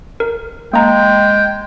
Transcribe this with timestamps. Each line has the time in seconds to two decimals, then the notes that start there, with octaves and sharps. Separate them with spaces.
0.20 A#4
0.73 G#3 A#3 G5 A#5